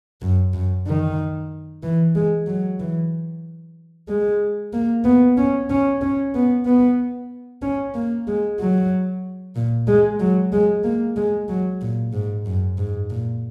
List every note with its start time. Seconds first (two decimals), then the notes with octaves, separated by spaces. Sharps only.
0.22 F#2
0.53 F#2
0.87 D#3
1.83 E3
2.15 G#3
2.47 F#3
2.79 E3
4.08 G#3
4.73 A#3
5.04 B3
5.37 C#4
5.70 C#4
6.01 C#4
6.34 B3
6.65 B3
7.62 C#4
7.94 A#3
8.27 G#3
8.60 F#3
9.56 A#2
9.87 G#3
10.20 F#3
10.52 G#3
10.84 A#3
11.16 G#3
11.48 F#3
11.81 A#2
12.13 G#2
12.46 F#2
12.78 G#2
13.10 A#2